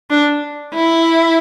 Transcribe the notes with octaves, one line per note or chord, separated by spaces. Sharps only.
D4
E4